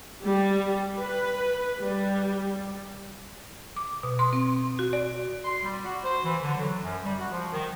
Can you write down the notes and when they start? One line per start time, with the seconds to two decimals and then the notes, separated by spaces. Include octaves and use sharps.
0.23 G3
0.97 B4
1.80 G3
3.76 D6
4.03 B2
4.19 C6
4.33 C4
4.79 F#4
4.93 D5
5.45 C6
5.63 G3
5.85 F#4
6.04 C5
6.24 E3
6.42 D3
6.57 F#3
6.83 F#2
7.04 G3
7.18 F#4
7.32 F3
7.52 D#3